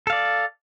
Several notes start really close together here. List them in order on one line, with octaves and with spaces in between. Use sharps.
A4 F5 D5